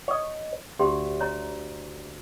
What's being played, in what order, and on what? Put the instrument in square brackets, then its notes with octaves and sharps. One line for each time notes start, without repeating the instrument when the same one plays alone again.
[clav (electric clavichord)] C#5 D#5
[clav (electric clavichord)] D2 [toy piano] G4 C6
[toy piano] C#5 A#5